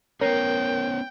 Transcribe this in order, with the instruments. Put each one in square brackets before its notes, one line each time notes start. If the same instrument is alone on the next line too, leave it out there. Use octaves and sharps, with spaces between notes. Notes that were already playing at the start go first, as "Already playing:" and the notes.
[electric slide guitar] B3 C#4 [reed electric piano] A#4 [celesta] C#5 A#6 C7 [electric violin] G5